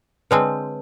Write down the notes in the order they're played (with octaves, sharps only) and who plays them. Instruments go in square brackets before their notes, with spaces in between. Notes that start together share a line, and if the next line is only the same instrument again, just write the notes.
[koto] D3 G#3 C4 [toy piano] B4 C#5 A5